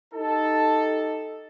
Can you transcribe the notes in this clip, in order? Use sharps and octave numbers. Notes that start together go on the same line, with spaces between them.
D#4 G4 A4